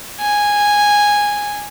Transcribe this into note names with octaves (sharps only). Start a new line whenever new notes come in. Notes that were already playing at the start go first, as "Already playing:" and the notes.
G#5